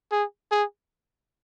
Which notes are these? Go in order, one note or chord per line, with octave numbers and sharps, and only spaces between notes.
G#4
G#4